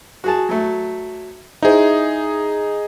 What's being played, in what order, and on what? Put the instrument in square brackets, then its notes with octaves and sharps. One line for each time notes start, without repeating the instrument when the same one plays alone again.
[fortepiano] F#4 G#4 A5
F#3 A3
[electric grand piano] D#4 G#4 [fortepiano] E4 C5